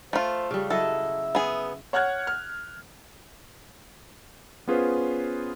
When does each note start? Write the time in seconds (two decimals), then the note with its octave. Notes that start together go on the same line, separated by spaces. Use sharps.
0.13 A3 F4 C5
0.51 C#3 G3
0.70 F#3 E4 A4 D#5 E5
1.35 B3 G#4
1.93 C#5 F#5 F6 F#6 G#6
2.27 F6
4.68 B3 C#4 F4 G#4 B4 C5